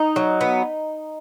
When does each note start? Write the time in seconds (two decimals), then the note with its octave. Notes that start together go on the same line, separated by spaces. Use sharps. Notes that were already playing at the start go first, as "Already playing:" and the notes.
Already playing: D#4
0.16 F#3
0.41 B3